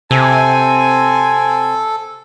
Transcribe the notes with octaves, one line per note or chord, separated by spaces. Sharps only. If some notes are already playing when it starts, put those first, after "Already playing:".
C3 C4 A4 G#5